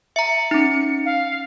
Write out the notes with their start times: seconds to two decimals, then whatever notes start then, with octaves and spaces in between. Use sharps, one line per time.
0.16 E5 A#5 C#7
0.51 C#4 D#4
1.05 F5